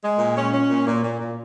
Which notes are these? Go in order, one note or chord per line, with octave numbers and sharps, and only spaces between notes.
G#3
A#2
C#4
C#4
A#2
A#2
A#2
A#2